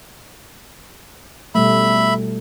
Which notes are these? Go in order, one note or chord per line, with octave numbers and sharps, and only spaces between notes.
B2 G3 A3 E5 B5